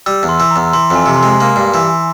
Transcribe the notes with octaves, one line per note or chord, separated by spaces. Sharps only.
G3 E6
E2
C6
E3
A#5
E2
E3 C6
F2
G#5
C3
C6
G#3
A#3 C6
G2
E3